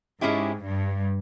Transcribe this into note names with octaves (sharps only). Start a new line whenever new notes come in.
G#2 G#3 C#4 E4 G4
G2